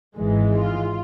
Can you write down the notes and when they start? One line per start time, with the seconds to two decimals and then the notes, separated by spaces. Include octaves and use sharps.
0.17 G#1 G#2 E3 G#3
0.56 F4